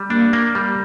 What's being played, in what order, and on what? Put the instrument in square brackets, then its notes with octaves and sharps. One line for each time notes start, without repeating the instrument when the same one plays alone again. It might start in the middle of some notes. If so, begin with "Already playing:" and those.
Already playing: [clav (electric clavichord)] G3
[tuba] A#3 [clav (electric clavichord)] D4
[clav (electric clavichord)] A#3
G3